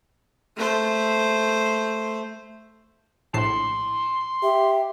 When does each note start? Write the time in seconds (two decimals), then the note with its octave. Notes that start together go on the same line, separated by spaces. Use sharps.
0.57 A3 C5
3.34 A#1 A2 A5 C6 C7
4.43 G4 E5